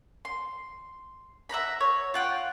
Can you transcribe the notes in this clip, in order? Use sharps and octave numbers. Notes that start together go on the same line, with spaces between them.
C6
E5 F#5 A#5 B5
C#5
F4 F#5 G5